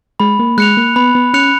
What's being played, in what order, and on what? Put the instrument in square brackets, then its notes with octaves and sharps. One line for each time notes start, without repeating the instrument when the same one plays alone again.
[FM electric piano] G#3 [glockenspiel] B5
[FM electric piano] A#3
[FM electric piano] G#3 [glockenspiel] F#6 C#7 F7
[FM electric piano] A#3
[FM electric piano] B3 [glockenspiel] B5
[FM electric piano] B3
[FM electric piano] C#4 [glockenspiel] F#6 C#7 F7